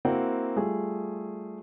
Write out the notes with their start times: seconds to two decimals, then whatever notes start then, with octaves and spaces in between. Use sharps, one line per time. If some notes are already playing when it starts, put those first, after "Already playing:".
0.05 A#3 C4 E4 F#4 F#5 G5
0.56 G3 A3 F4 G#4